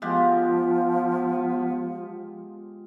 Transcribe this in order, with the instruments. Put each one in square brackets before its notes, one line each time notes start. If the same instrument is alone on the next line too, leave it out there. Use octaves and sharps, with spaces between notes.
[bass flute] F3 [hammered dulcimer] G#3 F4 G4 [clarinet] B3